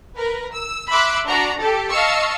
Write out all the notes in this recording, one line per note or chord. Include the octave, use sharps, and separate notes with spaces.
A#4 B4
E6
E5 B5 C6 D6 E6 F#6
D4 F#4 A#5
G4 A4
D#5 F5 A5 C#6 E6